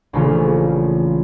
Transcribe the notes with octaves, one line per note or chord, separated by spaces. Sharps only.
A#1 C#3 E3 A3 C#4 F4